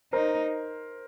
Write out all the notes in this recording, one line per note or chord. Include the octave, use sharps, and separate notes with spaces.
D#4 A#4 C5